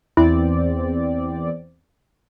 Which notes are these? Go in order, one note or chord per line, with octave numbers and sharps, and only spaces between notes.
E2 C4 E4 D5